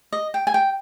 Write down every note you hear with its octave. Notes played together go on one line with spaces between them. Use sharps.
D#5
G5
G#5
G5